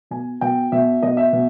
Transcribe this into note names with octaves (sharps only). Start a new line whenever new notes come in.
B2 G#5
B2 G5
B2 E5
B2 D#5
E5
B2